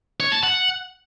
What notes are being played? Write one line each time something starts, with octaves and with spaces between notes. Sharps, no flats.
C#5
A5
F#5